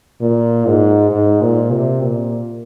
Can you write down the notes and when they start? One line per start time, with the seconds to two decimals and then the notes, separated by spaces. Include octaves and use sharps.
0.21 A#2
0.66 G#2
1.11 G#2
1.42 A#2
1.72 C3
2.02 A#2